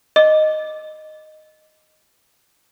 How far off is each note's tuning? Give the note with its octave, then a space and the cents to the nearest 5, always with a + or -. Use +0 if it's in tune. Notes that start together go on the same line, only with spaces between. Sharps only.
D#5 -5 D6 +0